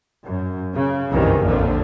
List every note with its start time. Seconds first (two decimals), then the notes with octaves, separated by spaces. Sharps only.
0.23 F#2
0.75 C#3
1.10 F#1 C2 G2 C3 D#3 E3
1.43 A#1 F2 A#2 D3 F3